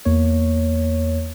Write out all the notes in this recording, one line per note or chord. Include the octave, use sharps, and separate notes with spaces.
E2 A#3 C#5